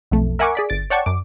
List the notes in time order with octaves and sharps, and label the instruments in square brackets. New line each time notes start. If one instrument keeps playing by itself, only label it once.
[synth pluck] B1 F2 A3
A#4 E5 F#5 G#5 C#6 D6
G#4 D5 B6
G1 A6 D7
C#5 D5 F#5 G5 A5 C#6
F#2 D6